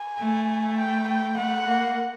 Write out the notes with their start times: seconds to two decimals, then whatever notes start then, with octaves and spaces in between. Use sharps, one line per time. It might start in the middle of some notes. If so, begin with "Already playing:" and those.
Already playing: G#5
0.19 A3
0.78 G5
1.09 G5
1.37 A3 F#5
1.66 A#3